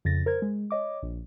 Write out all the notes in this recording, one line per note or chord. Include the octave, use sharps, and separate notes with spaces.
F2 C#3 A6 A#6
A#4 C5 G#6
G#3
C#5 D#5 D6
A#1